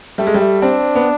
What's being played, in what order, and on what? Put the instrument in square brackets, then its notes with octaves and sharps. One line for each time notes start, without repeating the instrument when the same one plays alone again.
[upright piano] G3 [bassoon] A3
[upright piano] G#3
G3
[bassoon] A3
[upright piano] C4 [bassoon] D4
[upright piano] B3